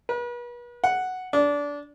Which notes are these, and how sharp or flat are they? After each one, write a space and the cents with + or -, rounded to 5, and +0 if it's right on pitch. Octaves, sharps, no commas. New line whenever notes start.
B4 -40
F#5 +0
D4 -20